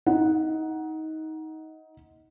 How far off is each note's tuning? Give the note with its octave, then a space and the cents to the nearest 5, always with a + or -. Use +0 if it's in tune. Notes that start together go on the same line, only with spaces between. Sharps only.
D#4 +20 F#5 +0